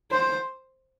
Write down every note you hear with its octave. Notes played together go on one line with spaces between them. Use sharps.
C5